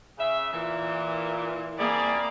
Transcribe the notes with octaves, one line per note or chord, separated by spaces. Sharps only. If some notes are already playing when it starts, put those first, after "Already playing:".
C#3 E5
A#2 E3
A#3 C4 E4 G#4 D5